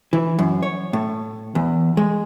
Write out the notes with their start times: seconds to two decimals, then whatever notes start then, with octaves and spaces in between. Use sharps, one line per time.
0.13 E3
0.39 F#2
0.62 C#5
0.93 A2
1.55 E2
1.97 G#3